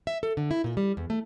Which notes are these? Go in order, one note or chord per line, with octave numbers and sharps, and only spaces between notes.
E5
A4
D3
E4
A#2
G3
E2
A3